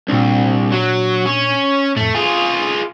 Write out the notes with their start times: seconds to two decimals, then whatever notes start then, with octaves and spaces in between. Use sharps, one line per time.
0.09 C2 A#2 D4
0.72 F#3
1.26 C#4
1.96 F2 A2 A3
2.15 F4 G#4 G#5